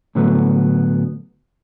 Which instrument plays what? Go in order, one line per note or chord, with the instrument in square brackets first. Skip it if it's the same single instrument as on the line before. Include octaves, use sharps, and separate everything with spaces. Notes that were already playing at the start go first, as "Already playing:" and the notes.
[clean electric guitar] A2 D3 F#3 A3 B3